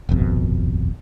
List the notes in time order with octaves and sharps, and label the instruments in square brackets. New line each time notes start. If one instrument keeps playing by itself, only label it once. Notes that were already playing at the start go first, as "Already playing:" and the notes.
[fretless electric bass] D#1 G#1 F2 B2